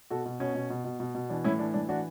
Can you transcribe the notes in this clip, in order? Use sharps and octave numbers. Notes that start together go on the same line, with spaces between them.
B2 F#4 A4
B2
B2 C#4
B2
B2
B2
B2
B2
E3 D4
A2 C#4 E4
E3 D4
A2 D4
E3 D4 F#4